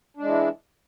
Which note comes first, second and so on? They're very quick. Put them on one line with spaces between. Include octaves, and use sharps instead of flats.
D4 G#3 E3